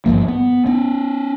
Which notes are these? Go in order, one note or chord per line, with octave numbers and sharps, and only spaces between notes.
G#1 G2 F3 A#3
B3
B3 C#4